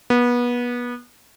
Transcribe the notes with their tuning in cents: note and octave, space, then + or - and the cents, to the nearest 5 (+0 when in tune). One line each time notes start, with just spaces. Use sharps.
B3 -25